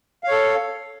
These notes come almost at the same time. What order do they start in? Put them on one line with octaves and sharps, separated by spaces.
F5 C#5 A4